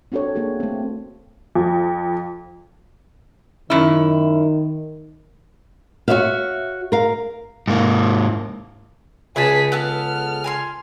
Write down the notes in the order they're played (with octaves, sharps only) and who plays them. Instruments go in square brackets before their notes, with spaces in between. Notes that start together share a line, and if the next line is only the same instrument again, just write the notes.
[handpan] C4 D4 F#4 A4 C#5
A#3 D4 F#4 G#4
A3 C4
[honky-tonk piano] F2
[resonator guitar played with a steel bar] F#2 E4 [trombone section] D#3
[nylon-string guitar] F#4 A4 C#5 E5 F5
A#4 F5
[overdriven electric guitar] G#2 A#3
[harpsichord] C#2 [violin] G#4 B6 [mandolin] B4 G#5 A5
[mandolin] B3 A4 A5 [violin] F6
[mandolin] G#5 A#5 C6